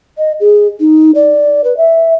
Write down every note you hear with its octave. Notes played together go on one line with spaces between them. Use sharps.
D#5
G#4
D#4
D5
B4
E5